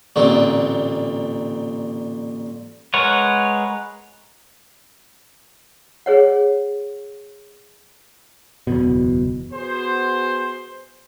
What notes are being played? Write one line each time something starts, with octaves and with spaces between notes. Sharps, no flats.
A1 A#2 D3 C4
G#3 A#4 B4 C#5 F#5
G#4 C#5 F#5
F#1 E2 B2
B3 F#4 G#4 C5